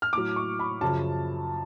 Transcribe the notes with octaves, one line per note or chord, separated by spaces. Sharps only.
F6
A2 F#3 D6
C#6
B5
F#2 C#3 F3 A5